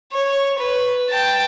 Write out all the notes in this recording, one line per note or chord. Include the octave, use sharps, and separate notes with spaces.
C#5
B4
G5 A5